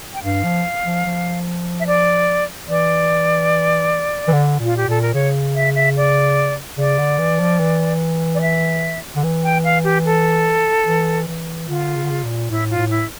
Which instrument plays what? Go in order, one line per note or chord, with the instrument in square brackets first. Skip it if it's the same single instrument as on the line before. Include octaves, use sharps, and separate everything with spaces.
[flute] G5
[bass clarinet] G2 [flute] F5
[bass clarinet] F3
F3
F3
[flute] E5
D5
[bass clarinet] E3 [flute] D5
[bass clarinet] E3
D3
[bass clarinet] A#2 [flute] F4
[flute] G4
[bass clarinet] A#2 [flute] A4
[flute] A#4
[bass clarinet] C#3 [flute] C#5
[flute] E5
E5
D5
[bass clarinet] C#3 [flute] D5
[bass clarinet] D3
E3
F3
E3
[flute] D5
E5
[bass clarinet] D3
E3
[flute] G5
F5
G4
A4
[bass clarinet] E3
E3
[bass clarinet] D3 [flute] F4
[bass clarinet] C#3
D3
C#3
A#2
[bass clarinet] A2 [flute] E4
[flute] F4
[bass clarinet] A2
[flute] E4